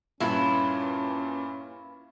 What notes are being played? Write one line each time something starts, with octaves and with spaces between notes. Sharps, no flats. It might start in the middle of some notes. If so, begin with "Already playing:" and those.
G2 A#2 C#4 E4 F4 B4 G#6